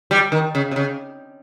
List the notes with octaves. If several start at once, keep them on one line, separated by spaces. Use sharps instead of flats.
G3
D#3
C#3
C3
C#3